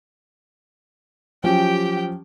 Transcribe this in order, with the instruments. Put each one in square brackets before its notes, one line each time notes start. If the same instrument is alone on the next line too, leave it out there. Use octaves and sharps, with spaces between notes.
[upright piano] F3 F#3 C#4 [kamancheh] G4 G5